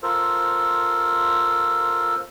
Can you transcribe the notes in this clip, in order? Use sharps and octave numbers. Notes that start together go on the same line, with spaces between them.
F4 A4 A#4 C5